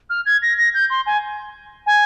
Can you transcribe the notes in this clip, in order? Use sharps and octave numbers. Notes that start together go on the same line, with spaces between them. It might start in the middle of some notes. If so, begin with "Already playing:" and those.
F6
G#6
A#6
A#6
G6
C6
G#5
G#5